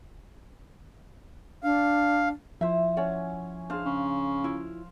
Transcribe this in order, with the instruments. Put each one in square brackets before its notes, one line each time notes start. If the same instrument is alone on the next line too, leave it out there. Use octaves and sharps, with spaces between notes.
[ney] D4 [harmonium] F5
[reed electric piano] F3 [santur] E4 C5 [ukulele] E5
[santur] C#4 [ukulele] C#5 D5 F#5
[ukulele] D4 G#4 [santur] C5 F5
[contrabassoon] C#3
[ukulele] E4 F4